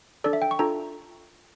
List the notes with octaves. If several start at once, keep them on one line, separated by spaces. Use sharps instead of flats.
D4 A4 D5
E5
G5
C#6
D4 F4 A4 A#5